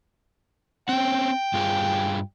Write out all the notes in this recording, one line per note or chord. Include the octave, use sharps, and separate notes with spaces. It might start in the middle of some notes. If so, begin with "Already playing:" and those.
C4 C#4 G5
G2 F4 G#4